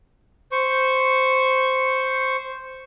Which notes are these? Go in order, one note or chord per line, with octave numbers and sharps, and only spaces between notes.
C5 C#6